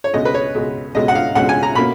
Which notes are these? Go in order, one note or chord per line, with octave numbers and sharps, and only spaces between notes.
C#5
C#2 B2 G#3 D#5
B4
C#5
C#2 B2 G#3
C#2 B2 G#3 D#5
F#5
F5
C#2 B2 G#3 F#5
G#5
A#5
B2 A#3 C#4 B5